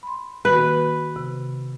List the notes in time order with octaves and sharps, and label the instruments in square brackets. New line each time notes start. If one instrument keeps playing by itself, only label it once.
[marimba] B5 C6
[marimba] D#3 A#3 F#4 [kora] B4
[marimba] C3